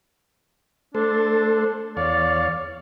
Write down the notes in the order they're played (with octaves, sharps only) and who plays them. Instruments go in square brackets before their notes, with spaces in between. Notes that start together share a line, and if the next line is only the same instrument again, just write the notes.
[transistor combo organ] A3 A4 C5 [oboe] D4
[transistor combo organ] E2 C#5 F5 [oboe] D5